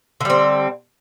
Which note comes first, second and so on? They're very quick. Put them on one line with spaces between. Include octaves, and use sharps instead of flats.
D3 G3 C4